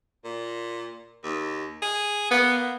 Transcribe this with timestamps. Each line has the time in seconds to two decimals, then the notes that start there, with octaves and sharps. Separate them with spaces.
0.25 A#2
1.24 D#2
1.82 G#4
2.31 A#3 B3